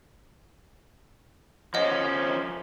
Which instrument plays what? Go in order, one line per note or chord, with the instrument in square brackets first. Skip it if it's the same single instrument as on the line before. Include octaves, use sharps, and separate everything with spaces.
[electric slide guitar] F3 C#4 [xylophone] C#5 D#5 F#5